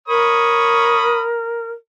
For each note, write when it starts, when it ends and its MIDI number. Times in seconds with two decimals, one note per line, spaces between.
0.08 1.70 70
0.08 1.24 73
0.08 1.24 83
0.08 1.24 87